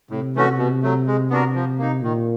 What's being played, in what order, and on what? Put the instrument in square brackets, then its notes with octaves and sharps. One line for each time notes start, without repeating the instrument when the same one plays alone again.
[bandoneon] A2 [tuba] C3
[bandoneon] E3 A3 C#4 F#4
B2
F#3 A3
G#3
B3 D4 F#4 A#4
F3
A#3 D#4
[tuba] A#2 [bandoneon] D#3